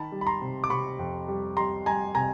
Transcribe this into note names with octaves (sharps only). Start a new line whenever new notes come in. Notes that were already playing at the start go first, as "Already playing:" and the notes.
Already playing: D#3 A5 B5
G3
B5
A#5 C6
C3
D6
C3 B5 C#6
F2
G3
G3 A#5 C6
G3 G#5 A#5
C3 G#5 A#5